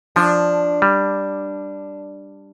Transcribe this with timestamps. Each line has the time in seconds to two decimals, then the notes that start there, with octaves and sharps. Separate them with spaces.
0.16 F3 D4
0.82 G3